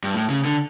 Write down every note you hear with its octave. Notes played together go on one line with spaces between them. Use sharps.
G2
A2
C#3
D3